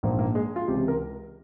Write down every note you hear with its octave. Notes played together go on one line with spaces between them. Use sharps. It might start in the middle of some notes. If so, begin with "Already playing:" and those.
A#1 G#2 F3 A#3
A#3
G#3
F4
C#2 C3 E3 G4
A#4